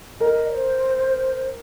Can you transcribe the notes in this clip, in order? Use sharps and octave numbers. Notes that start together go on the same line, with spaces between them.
A#4 D#5
C5